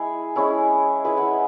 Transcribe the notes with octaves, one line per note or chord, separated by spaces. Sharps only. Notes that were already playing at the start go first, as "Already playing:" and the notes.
Already playing: G#3 E4 G#4
G#3 C#4 E4
G#3 E4 B4
E5 F#5